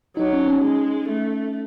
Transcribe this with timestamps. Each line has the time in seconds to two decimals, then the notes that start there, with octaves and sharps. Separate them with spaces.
0.17 F#3 D#4
0.33 C#4
0.48 C#4
0.63 G#3
1.08 A3